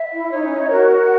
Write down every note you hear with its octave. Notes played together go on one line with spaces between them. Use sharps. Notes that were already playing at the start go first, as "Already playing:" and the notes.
Already playing: E5
E4
D#4 C#5
C#4
D#4
F#4 A#4